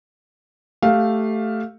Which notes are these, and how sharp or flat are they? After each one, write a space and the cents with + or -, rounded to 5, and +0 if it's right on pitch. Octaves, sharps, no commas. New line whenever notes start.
A3 +0 G4 -5 F5 +5